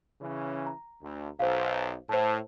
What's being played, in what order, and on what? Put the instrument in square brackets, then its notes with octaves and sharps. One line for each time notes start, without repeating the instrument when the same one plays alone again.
[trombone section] C#3 E3 C#4
[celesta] A#5
[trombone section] D2
[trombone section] B1 [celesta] C5 F5
[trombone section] A2 [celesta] C5 A5